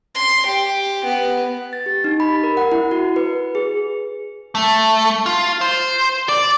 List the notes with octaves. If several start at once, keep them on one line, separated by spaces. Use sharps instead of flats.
C6
G4
B3
A6
G4
D#4
B5
A#4
F#5
E4
F#4
B4
G#4
A3
F4
C5
D5